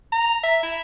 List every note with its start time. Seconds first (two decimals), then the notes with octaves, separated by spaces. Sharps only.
0.12 A#5
0.43 E5
0.63 E4